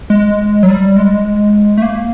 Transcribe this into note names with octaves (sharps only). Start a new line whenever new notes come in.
G#3
F#3
G3
G#3
A3
A#3